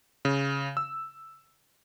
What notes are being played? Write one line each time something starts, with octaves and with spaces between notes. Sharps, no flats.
C#3
E6